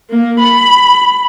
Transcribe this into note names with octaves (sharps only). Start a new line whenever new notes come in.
A#3
B5